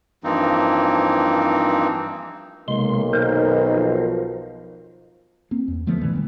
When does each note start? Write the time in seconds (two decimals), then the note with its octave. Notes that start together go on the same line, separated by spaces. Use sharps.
0.24 G2 E3 F3 A#3 C4 D#4
2.68 B1 C3 G#3 A#3 C6
3.13 D#3 A#4 C5
3.70 F3
5.51 A#3 C4
5.68 E2
5.87 D3 F3 A3 B3
6.01 G2 A#2 D3 E3
6.14 D#3 E3 G3